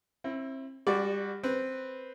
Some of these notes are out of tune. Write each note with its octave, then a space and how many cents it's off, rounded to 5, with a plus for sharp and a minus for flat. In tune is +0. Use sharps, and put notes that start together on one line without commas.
C4 +35 E4 +0
G3 +25 F#4 +0 D5 +0
C4 +0 B4 +0